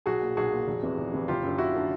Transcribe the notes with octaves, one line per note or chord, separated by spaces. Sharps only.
B1 F#4 G#4
A#2
B1 F#4 G#4
A#2
F1
E2 C3 E3
F1
E2 C3 E3
F#1 F4 G4
F#2 D3
F#1 E4 F#4
D3